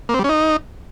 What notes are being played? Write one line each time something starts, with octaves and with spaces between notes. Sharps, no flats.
A#3
C4
G3
C#4
D#4